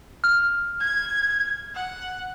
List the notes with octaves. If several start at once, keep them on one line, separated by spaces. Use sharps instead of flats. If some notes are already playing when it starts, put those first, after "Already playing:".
F6
G#6
F#5